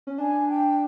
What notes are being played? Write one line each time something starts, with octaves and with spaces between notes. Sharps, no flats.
C#4
D4 G#5
G5